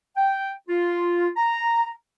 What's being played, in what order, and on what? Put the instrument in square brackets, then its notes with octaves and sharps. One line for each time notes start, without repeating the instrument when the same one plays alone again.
[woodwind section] G5
F4
A#5